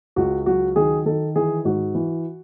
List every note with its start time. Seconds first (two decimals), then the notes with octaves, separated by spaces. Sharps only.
0.16 C#2 F#4
0.46 F#3 F#4
0.76 D#3 G#4
1.06 D#3 A4
1.36 E3 G#4
1.65 G#2 F#4
1.95 E3